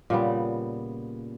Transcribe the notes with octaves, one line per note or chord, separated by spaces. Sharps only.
A#2 C#3 G3 B3